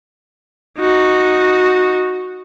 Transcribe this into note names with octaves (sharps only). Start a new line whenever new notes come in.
D#4 F#4